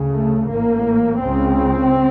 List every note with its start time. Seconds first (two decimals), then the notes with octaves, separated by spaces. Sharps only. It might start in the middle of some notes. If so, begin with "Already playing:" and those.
Already playing: D2 C#3
0.13 A3
0.49 A1 A2 A#3
1.22 C#2 C#3 C4